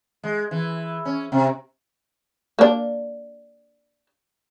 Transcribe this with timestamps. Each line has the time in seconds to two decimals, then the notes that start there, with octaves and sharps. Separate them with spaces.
0.23 G#3
0.51 E3
1.05 C#4
1.32 C3
2.59 A#3 D4